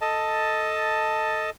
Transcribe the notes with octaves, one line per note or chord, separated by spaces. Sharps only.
A4 D#5 A5